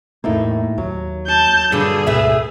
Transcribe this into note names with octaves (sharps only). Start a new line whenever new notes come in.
E2 A2 A#3 D#4 E4
D#2 F#3
A5 G6
G2 A#2 D3 G3 G#4
D2 G#2 B2 A3 B4 E5